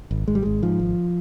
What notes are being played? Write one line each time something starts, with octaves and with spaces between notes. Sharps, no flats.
G#1
G#1 G#3
G3
G#1 G#3
G#2 F3
G#1